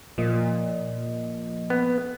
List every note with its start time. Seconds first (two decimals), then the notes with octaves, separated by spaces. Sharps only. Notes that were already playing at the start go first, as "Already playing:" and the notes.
0.18 A#2 F3 A#3 D#5
1.70 B3